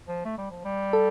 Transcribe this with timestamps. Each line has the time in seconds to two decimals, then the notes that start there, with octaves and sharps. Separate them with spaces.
0.08 F3
0.25 A3
0.38 G3
0.51 F3
0.65 G3
0.93 A4